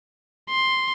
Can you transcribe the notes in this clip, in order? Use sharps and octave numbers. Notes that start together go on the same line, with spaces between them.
C6